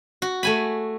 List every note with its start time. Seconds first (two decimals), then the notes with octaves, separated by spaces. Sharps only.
0.22 F#4
0.43 A3 G#5 B5